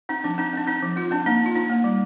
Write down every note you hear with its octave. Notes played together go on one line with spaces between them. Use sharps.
C4 D#4
F3 D4
C4 D#4
C4 D4
C4 D#4
F3
C4 F4
C4 D4
A#3 D#4
D4 F4
D4 D#4
A#3
G3